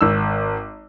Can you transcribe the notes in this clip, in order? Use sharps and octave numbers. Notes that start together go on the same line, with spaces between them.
G#1 E6